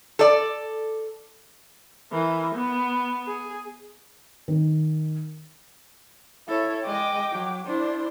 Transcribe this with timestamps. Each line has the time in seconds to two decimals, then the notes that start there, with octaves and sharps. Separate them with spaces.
0.19 A4 D5
2.12 E3 A#4
2.55 B3
3.27 G#4
4.48 D#3
6.48 E4 A4 C#5
6.85 G#3 D#5 G5 D6
7.32 F#3
7.66 D4 E4 C5 C6